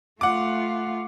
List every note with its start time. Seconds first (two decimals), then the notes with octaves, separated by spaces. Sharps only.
0.21 A3 F4 F#5 D6